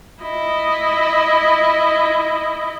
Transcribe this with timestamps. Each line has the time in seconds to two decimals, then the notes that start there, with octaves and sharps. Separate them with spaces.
0.22 E4 D#5